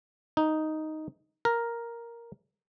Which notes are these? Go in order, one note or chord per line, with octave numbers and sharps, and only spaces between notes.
D#4
A#4